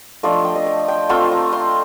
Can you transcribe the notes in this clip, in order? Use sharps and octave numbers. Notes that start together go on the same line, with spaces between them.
F3 A3 D4 F4 D#5
G5
D#5
F5
G5
A3 C4 F4 G5
A#5
C6